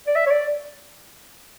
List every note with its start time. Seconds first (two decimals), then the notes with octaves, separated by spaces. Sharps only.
0.07 D5
0.15 E5
0.26 C#5
0.31 D5